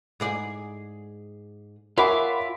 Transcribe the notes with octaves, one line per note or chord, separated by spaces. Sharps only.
G#2 G#4 D5
F4 G#4 A#4 C#5 E5 F#5 B5 D6